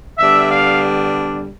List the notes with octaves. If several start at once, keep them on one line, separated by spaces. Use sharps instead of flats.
D3 G3 B3 D4 E5
F5